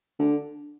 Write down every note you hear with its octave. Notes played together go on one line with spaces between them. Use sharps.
D3